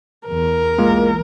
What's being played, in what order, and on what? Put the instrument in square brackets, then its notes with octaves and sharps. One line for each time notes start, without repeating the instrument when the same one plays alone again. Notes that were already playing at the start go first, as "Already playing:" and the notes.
[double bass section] E2 [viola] A#4
[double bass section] B1 E3 [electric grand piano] G#3 A#3 F4